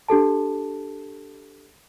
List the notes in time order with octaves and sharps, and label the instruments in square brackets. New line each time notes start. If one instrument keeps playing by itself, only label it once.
[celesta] D4 G4 A4 A5